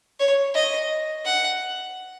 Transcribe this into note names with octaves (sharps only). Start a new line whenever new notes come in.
C#5
D#5
F#5